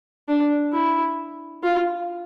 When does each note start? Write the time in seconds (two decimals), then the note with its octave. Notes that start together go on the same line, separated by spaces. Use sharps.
0.29 D4
0.73 E4
1.63 F4